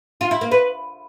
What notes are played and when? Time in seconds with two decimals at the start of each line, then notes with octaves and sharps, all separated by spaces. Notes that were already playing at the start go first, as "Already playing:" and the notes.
0.21 F4
0.31 E4
0.41 A#3
0.51 B4